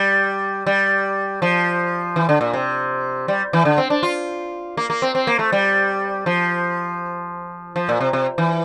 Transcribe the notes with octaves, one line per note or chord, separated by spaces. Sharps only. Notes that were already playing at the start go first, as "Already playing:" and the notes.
Already playing: G3
G3
F3
E3
D3
A#2
C3
G3
E3
D3
C4
D4
F4
A#3
A#3
C4
C4
A#3
A3
G3
F3
F3
A#2
C3
C3
E3